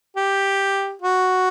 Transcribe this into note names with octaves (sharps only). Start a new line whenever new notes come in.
G4
F#4